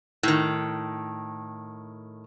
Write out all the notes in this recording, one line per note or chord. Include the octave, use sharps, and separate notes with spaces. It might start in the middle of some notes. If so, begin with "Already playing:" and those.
A2 D#3